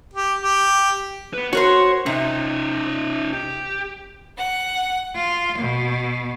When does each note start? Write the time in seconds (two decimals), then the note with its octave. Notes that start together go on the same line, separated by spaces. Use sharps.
0.14 G4
0.42 G4
1.33 B3 B4
1.53 F#4 A#4 C5 C#5
2.06 C3 C#4 D#4
3.33 G4
4.37 F#5
5.15 F4
5.57 B2